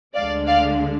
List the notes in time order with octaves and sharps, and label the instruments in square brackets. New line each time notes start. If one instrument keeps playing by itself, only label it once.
[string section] D2 D3 G#3 D4 D5 F5
D5 F5